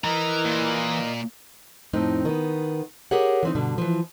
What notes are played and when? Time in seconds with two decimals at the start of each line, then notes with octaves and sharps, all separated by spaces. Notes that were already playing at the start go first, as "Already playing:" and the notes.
0.04 E3 A#4 D#5 A#5
0.46 A#2
1.93 F2 A2 C4 D#4
2.25 D#3 B3
3.11 G4 G#4 A#4 C#5 F#5
3.43 E3 C4 D#4
3.55 G2 B2 D3
3.78 E3 F3